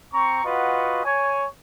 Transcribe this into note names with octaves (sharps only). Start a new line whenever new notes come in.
C4 A#5 C#6
F4 F#4 B4 D#5 F#5
C#5 G#5